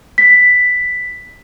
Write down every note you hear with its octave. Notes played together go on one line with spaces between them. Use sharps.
B6